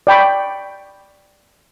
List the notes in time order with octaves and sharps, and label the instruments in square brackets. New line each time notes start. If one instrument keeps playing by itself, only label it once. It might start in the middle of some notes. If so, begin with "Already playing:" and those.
[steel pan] D5 G5 B5 C#6